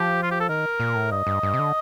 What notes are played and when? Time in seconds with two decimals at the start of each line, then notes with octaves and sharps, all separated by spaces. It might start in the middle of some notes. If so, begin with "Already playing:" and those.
Already playing: F3 G4
0.22 F4
0.31 G4
0.40 A4
0.49 D#3 A#4
0.80 A#2
0.95 A2
1.11 G2 D#5
1.27 G2
1.43 G2
1.54 C3
1.59 D3